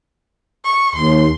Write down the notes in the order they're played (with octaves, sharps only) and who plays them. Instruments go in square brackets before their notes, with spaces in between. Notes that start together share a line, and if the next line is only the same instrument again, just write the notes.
[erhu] C#6
[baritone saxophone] D#2 [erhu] C6